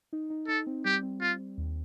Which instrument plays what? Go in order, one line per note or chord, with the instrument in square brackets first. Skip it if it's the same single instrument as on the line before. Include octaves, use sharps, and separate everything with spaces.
[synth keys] D#4
D#4
[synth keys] D#4 [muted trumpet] A4
[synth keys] C4
[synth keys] G3 [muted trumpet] G4
[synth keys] C4
[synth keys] C4 [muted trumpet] F4
[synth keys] C4
D#2